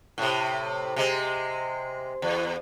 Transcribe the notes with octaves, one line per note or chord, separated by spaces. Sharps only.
A2 C3
C3 G#3
E2